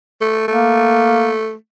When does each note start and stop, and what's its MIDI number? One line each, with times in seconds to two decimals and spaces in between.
0.21 0.45 57
0.48 1.54 57
0.48 1.33 58